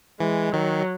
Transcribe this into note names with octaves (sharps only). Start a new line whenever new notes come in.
E3 G#3
D#3 F#3